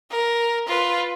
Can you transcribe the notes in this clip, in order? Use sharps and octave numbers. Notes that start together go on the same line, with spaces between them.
A#4
F4 B4